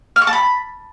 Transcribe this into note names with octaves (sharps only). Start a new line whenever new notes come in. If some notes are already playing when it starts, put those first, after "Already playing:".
F6
C#6
A5
B5